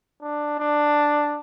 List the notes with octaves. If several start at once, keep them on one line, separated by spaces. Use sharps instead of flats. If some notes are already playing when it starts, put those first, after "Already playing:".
D4
D4